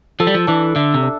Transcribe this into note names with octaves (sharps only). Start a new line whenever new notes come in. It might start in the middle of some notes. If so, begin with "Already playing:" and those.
F3 A4
G3
F3
E3 D4
D3 E5
C3
D4